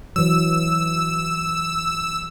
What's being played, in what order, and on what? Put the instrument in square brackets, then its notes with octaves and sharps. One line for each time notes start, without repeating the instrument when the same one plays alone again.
[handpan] E3 F#3 [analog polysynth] E6